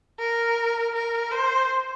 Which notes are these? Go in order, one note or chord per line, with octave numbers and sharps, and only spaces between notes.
A#4
A#4
C5